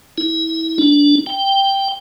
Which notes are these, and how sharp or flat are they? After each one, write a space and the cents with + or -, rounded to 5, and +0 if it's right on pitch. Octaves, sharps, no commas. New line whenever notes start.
E4 -30
D4 -20
G5 +0